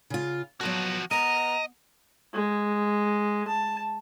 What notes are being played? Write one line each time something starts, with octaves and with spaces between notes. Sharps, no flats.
C#3 F4
F3 F#3 B3 F#4 A5
B3 D#5 A#5
G#3
A5